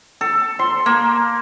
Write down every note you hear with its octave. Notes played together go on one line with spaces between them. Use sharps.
A4
C6
A#3